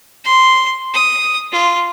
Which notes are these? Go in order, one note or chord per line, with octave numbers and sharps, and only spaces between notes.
C6
D#6
F4